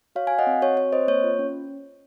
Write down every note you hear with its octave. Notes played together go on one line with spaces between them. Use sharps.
F#4 C#5 F5
F5 G#5
F#4
D#5 F#5
C4
F#4 C#5
C4 C#5
C4 C5 D#5
A#3 C#5
F4
C#4